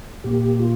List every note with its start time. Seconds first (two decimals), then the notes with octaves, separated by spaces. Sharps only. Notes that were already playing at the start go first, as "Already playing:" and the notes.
0.24 A#2 A#3 G4
0.59 F4